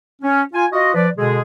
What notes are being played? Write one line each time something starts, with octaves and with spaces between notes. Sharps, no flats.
C#4
F4 G#5
F4 F#4 D#5
F3 B4 D5
B2 D3 G#3 G#4